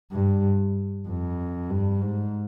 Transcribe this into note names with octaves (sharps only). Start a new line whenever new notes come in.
G2
F2
G2
G#2